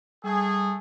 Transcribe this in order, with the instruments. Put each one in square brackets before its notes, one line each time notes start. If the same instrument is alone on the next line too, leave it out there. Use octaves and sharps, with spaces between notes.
[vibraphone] G3 [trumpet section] A3 G#4